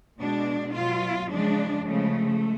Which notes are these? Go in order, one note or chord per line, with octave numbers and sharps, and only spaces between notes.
B2 G#3 D4
B2 F#3 F4
C#3 F3 G#3 D4
C#3 F3 G#3 A3